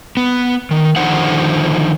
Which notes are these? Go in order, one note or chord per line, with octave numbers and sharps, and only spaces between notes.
B3
D#3
D3 D#3 F3 D#4 C5 F#5